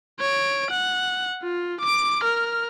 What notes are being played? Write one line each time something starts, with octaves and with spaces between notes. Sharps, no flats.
C#5 D7
F#5
F4
D6 D7
A#4 F6